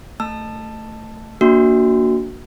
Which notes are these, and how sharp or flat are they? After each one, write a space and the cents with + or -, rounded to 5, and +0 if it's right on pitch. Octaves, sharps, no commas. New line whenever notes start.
A3 +10 A5 +0 E6 +20
A#3 +0 D4 -15 F#4 +0